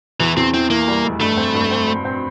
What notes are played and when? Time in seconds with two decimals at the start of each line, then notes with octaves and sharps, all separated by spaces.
0.20 E2 E3
0.37 E2 C4
0.54 E3 C4
0.70 E3 A#3
0.88 G3
1.04 F1
1.21 G2 A3
1.37 C4
1.54 G2
1.71 C4
1.88 C4
2.05 C4